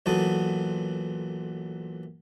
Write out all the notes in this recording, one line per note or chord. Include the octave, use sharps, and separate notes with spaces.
B1 A#2 E3 F#3 A4 D#6